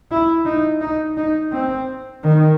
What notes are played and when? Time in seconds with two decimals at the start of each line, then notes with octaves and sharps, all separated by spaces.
0.11 E4
0.45 D#4
0.81 D#4
1.17 D#4
1.52 C4
2.24 D#3